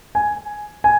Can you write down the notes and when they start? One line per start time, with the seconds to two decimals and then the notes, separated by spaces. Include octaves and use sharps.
0.15 G#5
0.84 G#5